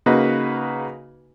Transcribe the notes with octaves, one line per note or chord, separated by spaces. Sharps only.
C#3 A#3 D#4 F#4 B4